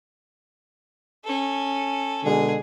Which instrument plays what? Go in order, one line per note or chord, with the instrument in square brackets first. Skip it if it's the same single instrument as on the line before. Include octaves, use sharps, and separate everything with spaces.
[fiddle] C#4 A4
[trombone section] B2 D3 G#3 [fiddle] G#4